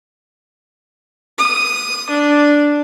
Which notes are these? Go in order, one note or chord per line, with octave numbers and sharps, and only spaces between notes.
D#6
D4